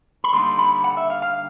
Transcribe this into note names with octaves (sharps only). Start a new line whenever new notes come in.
B5
D3 G3 A#3 D#4 C6
B5
F#5
E5
F5
F5